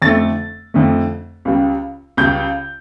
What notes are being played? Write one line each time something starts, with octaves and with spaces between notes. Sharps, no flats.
F2 D3 A3 A6
F2 D3 A3
C#2 C#3 G3
C#2 C#3 G3 G6